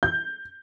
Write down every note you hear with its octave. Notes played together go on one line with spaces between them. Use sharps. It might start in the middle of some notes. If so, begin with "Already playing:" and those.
G6